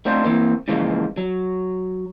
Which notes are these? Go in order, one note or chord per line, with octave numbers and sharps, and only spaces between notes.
A3 C4 D4 D#4 F4 C5
E3 A#3 C4
G#2 C#3 E3 F3 G#3 A#3
F#3